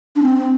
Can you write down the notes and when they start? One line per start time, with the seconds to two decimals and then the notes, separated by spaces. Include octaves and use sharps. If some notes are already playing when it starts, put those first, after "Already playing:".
0.16 D4
0.22 C4